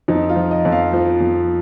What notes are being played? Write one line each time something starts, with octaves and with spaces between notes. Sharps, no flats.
F2 D#4
F4
F3
D#5
F2
F5
F3
F2